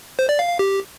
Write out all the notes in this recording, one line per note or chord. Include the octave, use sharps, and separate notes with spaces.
C5
D5
F5
F5
G4